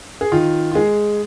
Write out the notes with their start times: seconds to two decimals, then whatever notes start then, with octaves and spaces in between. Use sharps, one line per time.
0.21 G#4
0.32 D#3 F4
0.71 F4
0.75 G#3 G#4